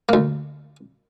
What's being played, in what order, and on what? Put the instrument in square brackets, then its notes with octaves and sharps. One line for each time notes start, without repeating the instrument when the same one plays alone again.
[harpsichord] D2 A#3